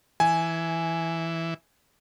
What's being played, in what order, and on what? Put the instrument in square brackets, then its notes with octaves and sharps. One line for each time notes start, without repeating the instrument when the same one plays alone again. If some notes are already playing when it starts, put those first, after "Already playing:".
[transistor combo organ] E3 [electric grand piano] G#5